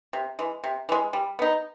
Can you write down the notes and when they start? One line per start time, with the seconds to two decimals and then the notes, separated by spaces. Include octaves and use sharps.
0.13 C3
0.39 E3 G#3
0.64 C3
0.89 E3 G#3
1.13 G3
1.39 B3 D#4